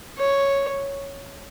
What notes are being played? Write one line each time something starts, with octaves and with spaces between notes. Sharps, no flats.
C#5